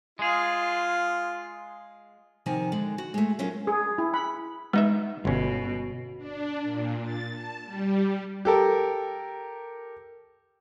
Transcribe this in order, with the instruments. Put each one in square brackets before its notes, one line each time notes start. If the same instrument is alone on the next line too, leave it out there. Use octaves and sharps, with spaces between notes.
[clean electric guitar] G#3 G#4 [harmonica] F4
[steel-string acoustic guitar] C3 D#3 F3 A#3 G#5 A5
D3 G#3
F#4
G#3 A3
F#3 C#4 F4 A#4
[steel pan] G#4
E4
B5
[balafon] G#3 [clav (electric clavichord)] B3 D#4 E5
[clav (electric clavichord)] G1 C#4 [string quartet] B2
[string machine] D4
A#2
A6
A5
G3
[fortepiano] G4 A4 A#4